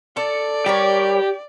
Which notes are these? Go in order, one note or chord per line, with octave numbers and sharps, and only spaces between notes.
A4 D5
G3 G4 A#4 C#5